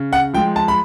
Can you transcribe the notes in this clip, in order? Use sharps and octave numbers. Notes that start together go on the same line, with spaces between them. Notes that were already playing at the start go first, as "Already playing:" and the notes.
Already playing: C#3
F#5
F3 G#3 G5
A5
B5